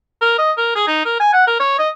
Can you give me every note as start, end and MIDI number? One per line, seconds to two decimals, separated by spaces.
0.22 0.36 70
0.38 0.52 75
0.57 0.71 70
0.75 0.84 68
0.87 1.03 63
1.05 1.19 70
1.20 1.31 80
1.33 1.46 78
1.47 1.58 70
1.60 1.76 73
1.79 1.89 75